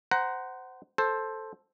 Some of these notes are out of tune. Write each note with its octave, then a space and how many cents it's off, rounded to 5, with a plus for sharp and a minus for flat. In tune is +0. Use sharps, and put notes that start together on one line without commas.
C5 -15 F#5 +15 A#5 +10
A4 +0 C5 +10